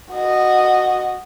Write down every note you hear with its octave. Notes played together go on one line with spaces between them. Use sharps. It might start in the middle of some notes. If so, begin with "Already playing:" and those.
F#4 D#5